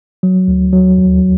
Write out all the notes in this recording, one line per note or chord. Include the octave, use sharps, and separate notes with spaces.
F#3
D2
F#3
D#2